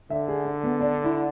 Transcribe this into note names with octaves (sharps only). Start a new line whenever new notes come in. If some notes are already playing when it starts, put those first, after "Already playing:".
D3 E5
G#4
D4
B3
D4
E4